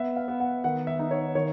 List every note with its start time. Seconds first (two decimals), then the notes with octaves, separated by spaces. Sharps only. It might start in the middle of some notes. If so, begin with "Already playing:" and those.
Already playing: B3 E5
0.16 F5
0.28 B3
0.40 F#5
0.64 D#3 F#5
0.87 E5
0.99 D#4
1.11 C#5
1.35 D#3 C#5